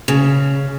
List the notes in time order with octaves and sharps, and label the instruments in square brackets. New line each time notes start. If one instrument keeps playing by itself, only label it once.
[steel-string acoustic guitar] C#3